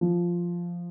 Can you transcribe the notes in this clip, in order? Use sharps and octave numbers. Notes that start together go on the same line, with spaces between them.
F3